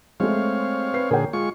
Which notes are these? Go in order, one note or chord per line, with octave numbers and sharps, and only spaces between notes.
G#3 A3 C4 C#5 F5
B4 C7
A#2 D3 G#4 A#4 C#5 G5
G#3 F4 C#6